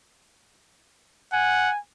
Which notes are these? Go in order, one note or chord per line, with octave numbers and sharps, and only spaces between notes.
F#5 G#5